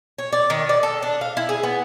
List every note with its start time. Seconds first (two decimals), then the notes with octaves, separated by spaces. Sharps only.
0.18 C#5
0.33 D5
0.50 D#3
0.69 D5
0.83 A4
1.03 D4
1.21 F5
1.37 E4
1.49 G#4
1.63 B3